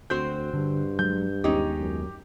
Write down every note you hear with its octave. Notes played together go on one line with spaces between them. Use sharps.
D2 C4 F#4 C5 G6
G2 D3
F#3 G#3 G6
D#2 G#3 B3 C#4 D#4 G4
F#2